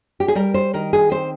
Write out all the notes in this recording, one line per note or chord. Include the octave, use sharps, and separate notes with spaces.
G4
G#4
G3 A#4
C5
D#3 A#4
G#4
C4 C5